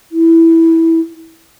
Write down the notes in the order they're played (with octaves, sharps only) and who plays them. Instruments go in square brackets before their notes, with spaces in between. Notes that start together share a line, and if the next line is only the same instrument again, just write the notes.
[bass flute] E4